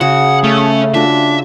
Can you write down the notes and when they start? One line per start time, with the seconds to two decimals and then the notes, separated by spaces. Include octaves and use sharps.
0.01 C#3 F#4 G#4 F#5
0.44 A3 C#4
0.94 D4 F4 F#4 E5